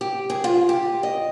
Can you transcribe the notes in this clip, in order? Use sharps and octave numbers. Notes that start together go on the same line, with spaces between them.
G4
G#4
F4
G4
D#5